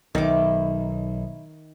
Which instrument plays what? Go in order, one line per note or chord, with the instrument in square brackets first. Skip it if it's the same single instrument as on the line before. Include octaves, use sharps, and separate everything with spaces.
[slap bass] B1 [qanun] D#3 D6 [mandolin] E4